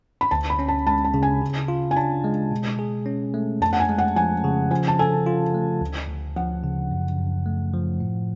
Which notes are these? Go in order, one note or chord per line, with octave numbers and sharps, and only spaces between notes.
B5
D2 A5
B5
C#4
A5
G#3 A5
A5
C#3
G#5
C#3
F4
G#5
D4 A5
G#3
B2
G#4
C#4
A3
F2 A5
F#5
G#5
G#3
F#5
F3 G#5
C#3
F3 G#5
A5
A4 G#5
F4
A3
D2
D2
F3 F#5
C#3
F#2
F#2
A3
F3
A2